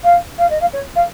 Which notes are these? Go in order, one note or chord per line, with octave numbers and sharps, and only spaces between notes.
F5
F5
D#5
F5
C#5
F5